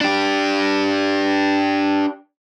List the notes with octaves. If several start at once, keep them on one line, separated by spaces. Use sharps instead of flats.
D4 G4